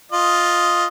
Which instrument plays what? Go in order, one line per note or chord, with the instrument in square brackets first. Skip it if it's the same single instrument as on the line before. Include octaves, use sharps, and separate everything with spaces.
[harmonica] F4 D#5